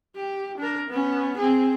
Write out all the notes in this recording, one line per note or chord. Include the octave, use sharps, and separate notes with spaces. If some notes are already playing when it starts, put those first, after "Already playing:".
G4
D4 A#4
B3 C#4
C4 G#4